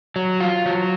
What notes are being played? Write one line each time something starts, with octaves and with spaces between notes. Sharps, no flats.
F#3
F4
F#3